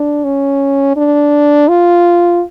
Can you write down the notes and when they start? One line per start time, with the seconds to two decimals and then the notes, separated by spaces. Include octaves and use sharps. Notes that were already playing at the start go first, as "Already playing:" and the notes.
Already playing: D4
0.24 C#4
0.96 D4
1.68 F4